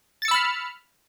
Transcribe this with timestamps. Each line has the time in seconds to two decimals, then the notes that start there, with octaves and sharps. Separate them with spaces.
0.22 A6
0.25 C#7
0.28 E6
0.31 B5
0.34 F6